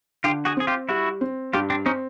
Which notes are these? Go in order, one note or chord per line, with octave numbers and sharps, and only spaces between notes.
D3 F4 G4
F#4 G#4
C4 G#4
F4 G4
G3 E4 F#4
C4
G2 F4 G4
C4 D4
C4 C#4 D#4